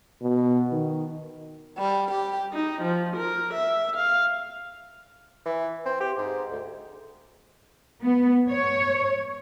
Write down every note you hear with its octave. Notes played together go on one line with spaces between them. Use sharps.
B2
D#3
G3
G4
D#4
F3
A#4
E5
F5
E3
C4
G4
G#2
D2
B3
C#5